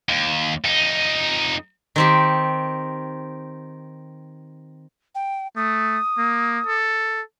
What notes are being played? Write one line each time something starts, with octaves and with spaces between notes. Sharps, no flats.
D#2
F2 D#4
D#3 C4 G4
G5
A3 D#6
A#3
A4